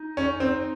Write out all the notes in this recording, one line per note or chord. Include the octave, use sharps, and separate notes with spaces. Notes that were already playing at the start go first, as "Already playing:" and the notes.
Already playing: D#4
C#4
C4